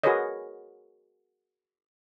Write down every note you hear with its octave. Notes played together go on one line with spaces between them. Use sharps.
F#4 G#4 A#4 B4 C#5 D#5